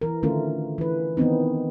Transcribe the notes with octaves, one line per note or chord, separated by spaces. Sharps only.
E3 A#4
D3 D#3 A3 C#4 F4 A#4
E3 B4
D#3 E3 B3 C4 D#4